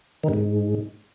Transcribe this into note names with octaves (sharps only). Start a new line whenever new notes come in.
D#3
G2
G#2